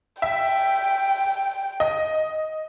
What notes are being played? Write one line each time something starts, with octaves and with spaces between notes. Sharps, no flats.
E5 G5
D#5